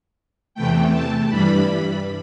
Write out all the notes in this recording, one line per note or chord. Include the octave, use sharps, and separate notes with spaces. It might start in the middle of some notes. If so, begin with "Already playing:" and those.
E2 C3 E3 A3 G5
A5
G2 E3 G3 B5